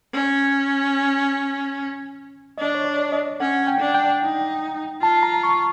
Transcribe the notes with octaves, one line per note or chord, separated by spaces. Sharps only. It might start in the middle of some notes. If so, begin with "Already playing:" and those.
C#4
D4 D#5
C#5
D5
D#5
C#4 F#5
G5
D4
G5
D#4
F4 A5
A#5
C#6